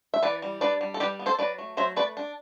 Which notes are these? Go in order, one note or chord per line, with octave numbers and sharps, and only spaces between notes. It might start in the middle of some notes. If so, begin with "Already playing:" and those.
E5
E3 B4 D5
G3
D4 B4 D5
G3
A4
G3 G4 B4
B3
A4 C5
F#3 B4 D5
A3
F#3 C5 E5
A3 B4 D5
D4